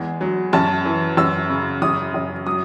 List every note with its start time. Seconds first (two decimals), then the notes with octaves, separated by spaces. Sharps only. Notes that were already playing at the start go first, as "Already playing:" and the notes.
Already playing: E2 G#3
0.21 F#3
0.53 F#2 A5
0.85 E3
1.17 F#2 E6
1.50 C#3
1.82 F#2 D#6
2.14 F#2
2.46 F#3 D#6